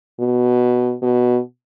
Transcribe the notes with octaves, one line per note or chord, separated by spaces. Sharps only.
B2
B2